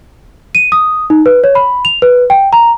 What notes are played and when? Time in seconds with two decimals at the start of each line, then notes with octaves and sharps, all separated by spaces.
0.55 D#7
0.72 D#6
1.10 D#4
1.26 B4
1.44 C#5
1.55 B5
1.85 F7
2.02 B4
2.30 G5
2.53 A#5